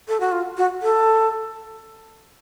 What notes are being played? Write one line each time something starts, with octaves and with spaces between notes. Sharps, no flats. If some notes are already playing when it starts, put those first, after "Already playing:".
A4
F#4
F4
F#4
A4